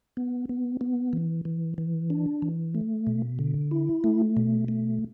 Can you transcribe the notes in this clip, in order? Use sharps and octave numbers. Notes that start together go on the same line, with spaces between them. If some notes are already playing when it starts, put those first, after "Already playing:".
B3
B3
B3
E3
E3
E3
D4
E3
A3
B2
D3
E4
A3
B2
A3